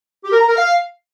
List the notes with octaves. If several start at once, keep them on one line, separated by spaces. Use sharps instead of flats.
G4
A#4
A#5
A#4
F5